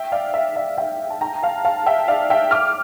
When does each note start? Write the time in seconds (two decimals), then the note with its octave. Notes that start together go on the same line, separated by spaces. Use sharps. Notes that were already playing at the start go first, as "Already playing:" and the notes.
Already playing: E5 G5
0.12 D5 F5
0.34 E5
0.56 D5 F5
0.78 E5 G5
1.10 A5
1.21 G5 A#5
1.43 F5 A5
1.65 F5 A5
1.86 E5 G5
2.08 D5 F5
2.30 E5 G5
2.51 D6 F6